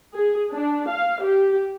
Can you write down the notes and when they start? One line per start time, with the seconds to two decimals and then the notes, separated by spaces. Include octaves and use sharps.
0.15 G#4
0.52 D4
0.90 F5
1.24 G4